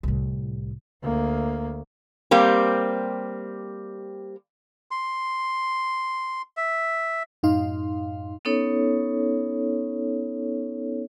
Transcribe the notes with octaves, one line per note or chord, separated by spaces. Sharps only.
C2 A2
D2 A#3
G3 A#3 C4 G4
C6
E5
F#2 A2 D#4 F5 C6
B3 C#4 D#4 A4 C#5